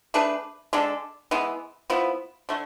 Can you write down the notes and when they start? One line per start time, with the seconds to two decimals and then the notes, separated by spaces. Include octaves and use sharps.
0.14 A3 D4 G#4 B4
0.73 D3 G#3 D4 A4
1.31 E3 G#3 B3
1.90 F3 B3 E4
2.49 D3 A3